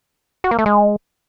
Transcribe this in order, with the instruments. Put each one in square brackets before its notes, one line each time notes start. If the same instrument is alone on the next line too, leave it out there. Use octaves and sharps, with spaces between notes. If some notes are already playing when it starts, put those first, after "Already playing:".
[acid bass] F#4
A#3
A3
G#3